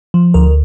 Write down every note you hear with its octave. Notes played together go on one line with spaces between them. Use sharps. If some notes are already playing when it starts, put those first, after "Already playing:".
F3
D2 A#4